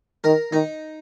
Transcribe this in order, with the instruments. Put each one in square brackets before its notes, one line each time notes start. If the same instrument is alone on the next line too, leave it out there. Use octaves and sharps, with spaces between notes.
[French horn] D#3 [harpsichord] A#4
[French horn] D#3 [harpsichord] D#4